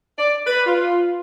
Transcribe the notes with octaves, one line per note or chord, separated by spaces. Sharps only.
D5
B4
F4